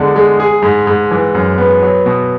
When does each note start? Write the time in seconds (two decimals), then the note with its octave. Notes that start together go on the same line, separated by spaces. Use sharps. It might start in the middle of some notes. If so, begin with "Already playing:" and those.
Already playing: E2 D3 G#3
0.16 G#3
0.40 G#4
0.62 G#2
0.87 G#2
1.11 E3
1.35 F#2
1.58 B3
1.82 F#3
2.06 B2